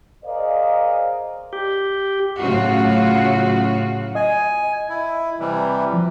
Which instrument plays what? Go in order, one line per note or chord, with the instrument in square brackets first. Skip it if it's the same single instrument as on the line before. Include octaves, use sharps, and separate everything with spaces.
[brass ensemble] G#4 A#4 C5 D5 D#5 F5
[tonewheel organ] G4
[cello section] A2 C#3 F#3 F4 F#4
[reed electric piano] D#5 [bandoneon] G#5
[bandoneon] E4
C3 E3 G3
[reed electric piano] F3